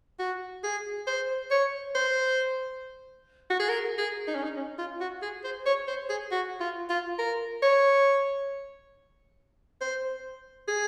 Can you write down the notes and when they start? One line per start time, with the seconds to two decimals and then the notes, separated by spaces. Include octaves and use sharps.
0.19 F#4
0.63 G#4
1.07 C5
1.51 C#5
1.95 C5
3.50 F#4
3.59 G#4
3.69 A#4
3.98 G#4
4.27 D#4
4.35 C#4
4.44 D#4
4.56 C#4
4.78 F4
5.01 F#4
5.22 G#4
5.44 C5
5.66 C#5
5.88 C5
6.10 G#4
6.31 F#4
6.60 F4
6.90 F4
7.19 A#4
7.63 C#5
9.81 C5
10.68 G#4